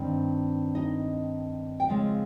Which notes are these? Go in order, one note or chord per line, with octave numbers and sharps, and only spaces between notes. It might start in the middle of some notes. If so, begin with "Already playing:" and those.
Already playing: G2 D#3 C4
D#4 D#5
G5
C#3 F3 G#3 C4 F4 F5